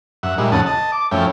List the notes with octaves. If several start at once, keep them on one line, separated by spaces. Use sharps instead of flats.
F#2 E5 F#5
A#2 G3 G#3 D#4 E4
F2 A2 C#3 F#5 A5 D#6
D#5 A5
D6
F#2 F3 A3 C#4 E4 G5